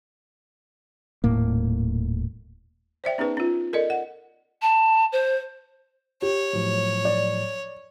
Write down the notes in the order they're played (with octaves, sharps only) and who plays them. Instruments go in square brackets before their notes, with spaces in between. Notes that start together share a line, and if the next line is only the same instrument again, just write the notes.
[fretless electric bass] D#1 A2 A#3
[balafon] C5 D5 E5 G5
B3 C#4 D#4 G#4 B4
C#4 F4
A4 A#4 D5 D#5
F#5
[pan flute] A5
C5
[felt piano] G4 [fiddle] C#5
[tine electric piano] A2 F3 F#3
[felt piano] D5